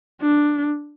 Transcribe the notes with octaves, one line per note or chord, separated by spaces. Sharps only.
D4